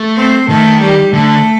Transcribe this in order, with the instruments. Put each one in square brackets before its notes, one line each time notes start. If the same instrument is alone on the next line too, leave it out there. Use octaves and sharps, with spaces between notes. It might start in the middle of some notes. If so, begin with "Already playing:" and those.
Already playing: [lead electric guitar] A3
[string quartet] C4 C5
[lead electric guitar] D#3 [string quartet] A3 A4
[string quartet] G3 G4
[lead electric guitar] D3 [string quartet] A3 A4